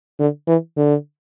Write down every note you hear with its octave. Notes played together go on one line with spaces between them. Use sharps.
D3
E3
D3